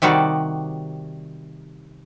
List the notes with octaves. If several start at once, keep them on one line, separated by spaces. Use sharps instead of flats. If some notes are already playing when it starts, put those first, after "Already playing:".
C3 D#3 G3 F#4 D5